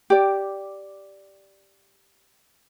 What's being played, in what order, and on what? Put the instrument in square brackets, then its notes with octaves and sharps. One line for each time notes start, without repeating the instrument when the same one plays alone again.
[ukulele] G4 D5